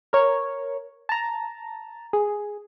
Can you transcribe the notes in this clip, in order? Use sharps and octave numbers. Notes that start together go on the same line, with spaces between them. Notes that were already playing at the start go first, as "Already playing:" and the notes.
A#4 C#5
A5 A#5
G#4